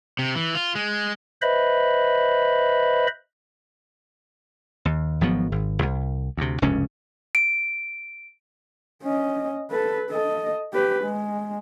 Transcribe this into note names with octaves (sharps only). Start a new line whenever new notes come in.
C3
E3
F4
G#3
B4 C5 D#5 E5 B5
D#2
G#1 F3 F#3 B3
G#1
C2
D2 C3
F1 C#2 G2 C#4
D7
C#4 D#5
A4 B4
A4 D#5
G4 B4
G#3